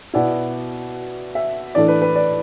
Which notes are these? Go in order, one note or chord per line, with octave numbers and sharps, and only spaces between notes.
B2 B3 E4 D5
E5
A2 E3 A3 D4 D5
B4
B4
D5